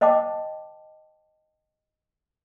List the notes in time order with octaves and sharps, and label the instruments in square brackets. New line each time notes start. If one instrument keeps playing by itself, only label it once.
[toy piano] C5 D#5 G5 A5 D6